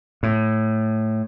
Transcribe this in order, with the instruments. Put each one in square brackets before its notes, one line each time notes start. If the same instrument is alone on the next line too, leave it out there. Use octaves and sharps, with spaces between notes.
[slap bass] A2